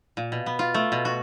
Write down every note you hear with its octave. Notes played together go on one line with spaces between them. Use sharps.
A#2
B2
B3
F4
A3
B2
F#4